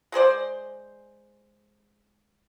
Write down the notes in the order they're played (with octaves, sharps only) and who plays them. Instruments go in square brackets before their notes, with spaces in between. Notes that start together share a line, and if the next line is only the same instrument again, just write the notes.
[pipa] G#3 G#4 C5 D5